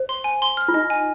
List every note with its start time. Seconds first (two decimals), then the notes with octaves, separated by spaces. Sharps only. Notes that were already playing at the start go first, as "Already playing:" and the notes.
Already playing: C5
0.09 C6
0.24 G#5
0.42 C6
0.57 F6
0.68 F4
0.74 D#4 D#5
0.90 G#5